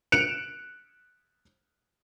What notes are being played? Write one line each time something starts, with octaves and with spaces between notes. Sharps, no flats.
F#6 C#7 D7 E7 F7